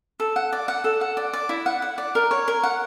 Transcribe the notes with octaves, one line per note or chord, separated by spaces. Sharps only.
A4
F#5
D5
F#5
A4
F#5
D5
D5
E4
F#5
F#5
D5
A#4
C#5
A#4
F#5